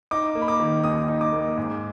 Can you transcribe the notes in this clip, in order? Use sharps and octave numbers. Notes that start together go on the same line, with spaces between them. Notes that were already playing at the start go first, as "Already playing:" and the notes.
D#4 D6
A#3
B5
D6
D#3
D#2 D#6
D#4
D6
A#3
G#2